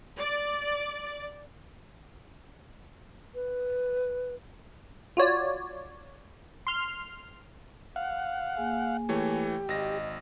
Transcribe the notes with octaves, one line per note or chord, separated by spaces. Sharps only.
D5
B4
F4 F#4 C#5 D5
C6 F6
F5 F#5
A#3 G#4 G#5
E3 A3 G4 C#5
G#1 D#5 A#6